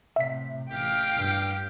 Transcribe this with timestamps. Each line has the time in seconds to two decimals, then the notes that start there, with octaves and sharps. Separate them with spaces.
0.16 A2 C3 E5 B6
0.71 A1 G4 F5 G5
1.15 G2